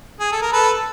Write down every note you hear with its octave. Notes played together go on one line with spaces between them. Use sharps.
G#4
A4
A#4
A4 B4